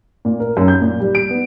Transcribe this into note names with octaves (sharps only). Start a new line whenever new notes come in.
A#2
A#4
F#2
G6
A#2
G3
D7
B3